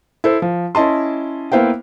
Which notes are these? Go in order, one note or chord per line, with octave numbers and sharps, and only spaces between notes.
E4 A4 C5
F3
C#4 E4 D#5 A5 C6
A#3 B3 E4 C5 F5 G5